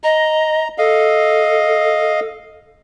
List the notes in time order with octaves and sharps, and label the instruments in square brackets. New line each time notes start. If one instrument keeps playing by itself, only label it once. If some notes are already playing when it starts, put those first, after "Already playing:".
[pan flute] D#5 [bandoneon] A#5
[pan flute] A4 [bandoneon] D#5 F5